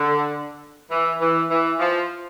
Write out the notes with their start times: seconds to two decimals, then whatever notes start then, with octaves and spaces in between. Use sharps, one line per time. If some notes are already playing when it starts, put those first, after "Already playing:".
Already playing: D3
0.91 E3
1.21 E3
1.50 E3
1.80 F3